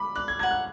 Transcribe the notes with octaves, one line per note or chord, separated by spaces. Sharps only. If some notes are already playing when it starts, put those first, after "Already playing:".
Already playing: B5 D6
D5 F#6
G#6
F#5 A#5 G#6
F#6